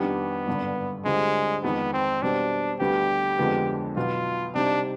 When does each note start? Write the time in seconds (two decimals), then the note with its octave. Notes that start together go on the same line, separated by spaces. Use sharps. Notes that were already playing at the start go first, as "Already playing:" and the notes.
Already playing: F2 D#3 G3 B3 D4 G4
0.47 G#1 G2 D3
1.05 D2 D3 G3 G#3 C4 F4
1.63 F2 D#3 G#3 B3
1.93 C4
2.22 B2 G3 C4 D4
2.80 D2 D3 G3 B3 G4
3.38 F2 D3 F3 G#3 B3
3.96 B1 B2 B3 F4
4.54 C3 G3 C4 D4 D#4